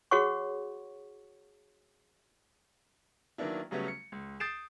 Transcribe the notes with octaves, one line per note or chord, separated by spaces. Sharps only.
F#4 G#4 C#5 F#5 C#6
D#3 F#3 A#3 B3 D4 E4
C#3 F#3 G3 A3 B3 C#4
C#7
C#2
D#6 G6 A6 C7 D7 E7